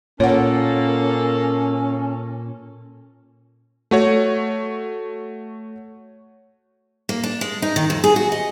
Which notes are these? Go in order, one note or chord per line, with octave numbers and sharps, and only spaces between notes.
A#2 A#3 C#4 A4 C#5 F#5
A3 F#4 C#5
A#3
D4
G#3
D#4
D#3
F2
G#4
F#4
D#5